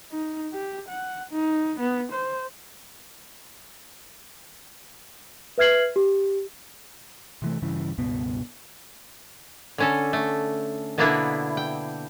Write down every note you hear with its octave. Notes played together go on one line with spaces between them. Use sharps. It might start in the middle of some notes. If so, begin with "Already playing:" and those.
D#4
G4
F#5
D#4
B3
C5
B4 E5 F6 G#6 C7 F#7
G4
C3 E3 A3
G2 C#3 E3
C#2 G2 B2 B3
D3 C#4 A4
A3
B2 D3 A#3 B3 D4 E4
G5